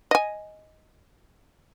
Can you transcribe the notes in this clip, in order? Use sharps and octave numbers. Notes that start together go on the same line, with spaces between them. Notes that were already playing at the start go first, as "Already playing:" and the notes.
D#5 G#5